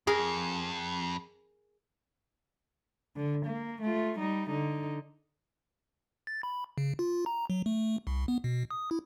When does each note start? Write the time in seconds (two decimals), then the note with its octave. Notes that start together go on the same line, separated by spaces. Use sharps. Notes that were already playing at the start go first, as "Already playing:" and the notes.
0.07 F2 G#4 A#4
3.16 D3
3.46 A#3
3.82 A3 F4
4.19 G3 D#4
4.49 D3 D#4
6.27 A6
6.43 B5
6.78 C#3
6.99 F4
7.26 A#5
7.50 F#3
7.66 A3
8.07 C2
8.28 B3
8.44 B2
8.71 D#6
8.91 E4